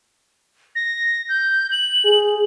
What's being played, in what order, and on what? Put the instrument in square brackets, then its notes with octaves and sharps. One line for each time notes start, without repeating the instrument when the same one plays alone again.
[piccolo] A#6
G6
F#7
[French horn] G#4